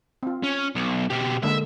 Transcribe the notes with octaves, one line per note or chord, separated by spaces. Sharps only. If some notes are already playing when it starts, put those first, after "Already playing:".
C4 F4
C#4
B1
B2 G4
D3 G#3 A#3 E5